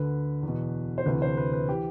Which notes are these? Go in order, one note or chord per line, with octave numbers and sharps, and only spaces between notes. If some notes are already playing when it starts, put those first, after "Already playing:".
Already playing: D2 D3 B4
E2
B2
C5
D2 C3 E3 B4
C5
B4
B4
E3 G4